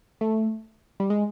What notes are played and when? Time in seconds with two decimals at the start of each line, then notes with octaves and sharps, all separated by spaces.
0.21 A3
1.00 G3
1.10 G#3